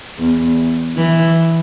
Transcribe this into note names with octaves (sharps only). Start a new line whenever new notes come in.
E2
E3